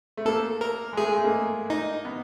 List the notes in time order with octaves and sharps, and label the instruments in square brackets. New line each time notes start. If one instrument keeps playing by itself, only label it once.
[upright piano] A3
[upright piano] A#3 [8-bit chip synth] A4
[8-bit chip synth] A#4
[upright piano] G#3
[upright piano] A3 [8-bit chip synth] G#4
[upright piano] G#3
A3
A#3
[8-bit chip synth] D#4
[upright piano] B3